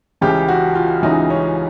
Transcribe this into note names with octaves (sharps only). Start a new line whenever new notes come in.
C#2 C#3 E3 G4
F#4
F4
C#2 C#3 E3 D#4
C#4